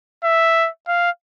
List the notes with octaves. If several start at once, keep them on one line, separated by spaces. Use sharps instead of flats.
E5
F5